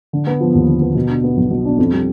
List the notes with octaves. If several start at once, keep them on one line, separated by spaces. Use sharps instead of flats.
D3
B3
F3
D#2
D3
B3
B2
D4
B3
B1
B2
D4
F2
G3